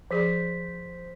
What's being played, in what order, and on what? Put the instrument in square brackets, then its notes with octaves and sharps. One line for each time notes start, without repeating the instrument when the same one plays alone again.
[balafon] F3 G#4 D5 [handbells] C5 B6